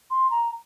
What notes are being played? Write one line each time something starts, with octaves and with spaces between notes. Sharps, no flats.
C6
A#5